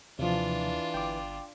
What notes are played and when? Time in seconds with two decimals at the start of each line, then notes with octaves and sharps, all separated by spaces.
0.19 D#2 C3 E3 F3 D4 F4
0.94 G1 G5 D6